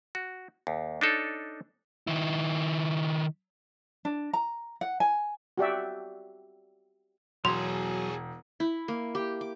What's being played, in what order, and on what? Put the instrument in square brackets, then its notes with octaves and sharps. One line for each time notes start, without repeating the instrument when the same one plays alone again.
[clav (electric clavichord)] F#4
D#2
D4 D#4 A4 C#5
[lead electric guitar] D#3 E4
[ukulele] D4
A#5
F#5
G#5
[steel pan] F#4 G4 D5 E5
[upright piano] E1 [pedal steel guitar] F#3 C#5 [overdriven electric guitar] G#4 A4 [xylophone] C6
[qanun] E4
A#3
G4
D6